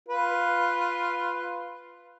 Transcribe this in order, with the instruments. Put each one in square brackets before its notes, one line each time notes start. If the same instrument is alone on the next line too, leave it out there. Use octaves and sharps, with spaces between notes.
[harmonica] F4 B4